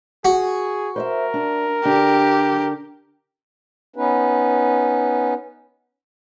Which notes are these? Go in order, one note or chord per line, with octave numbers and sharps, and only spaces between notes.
F#4 G#4
A#4 C5 D5 E5
D4
D3 D4 G4
B3 C#4 D#4 B4